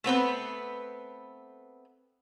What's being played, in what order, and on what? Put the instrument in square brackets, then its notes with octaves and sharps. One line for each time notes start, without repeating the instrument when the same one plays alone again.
[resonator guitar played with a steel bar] A3 B3 C4 B4